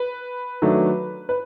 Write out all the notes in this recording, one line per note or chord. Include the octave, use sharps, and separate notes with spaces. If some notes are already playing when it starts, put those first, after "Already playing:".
Already playing: B4
D#3 F#3 A3 D4
B4